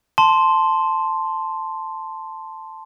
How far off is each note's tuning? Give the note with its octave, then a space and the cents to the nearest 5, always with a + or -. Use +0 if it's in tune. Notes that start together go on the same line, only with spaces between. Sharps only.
A5 +0 C6 +0